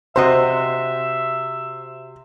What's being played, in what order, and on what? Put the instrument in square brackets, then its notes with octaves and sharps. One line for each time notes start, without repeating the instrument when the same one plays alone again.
[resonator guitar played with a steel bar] C3 F#4 D#5 [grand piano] C5 [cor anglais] E5